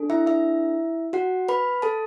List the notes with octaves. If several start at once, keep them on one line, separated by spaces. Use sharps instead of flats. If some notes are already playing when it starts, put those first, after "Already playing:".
Already playing: D4 A4
E4 E5
E4 E5
F#4 F#5
B4 B5
A4 A5